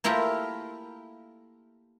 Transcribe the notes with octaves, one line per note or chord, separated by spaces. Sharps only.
A3 A#3 E4 F4 G4 A#4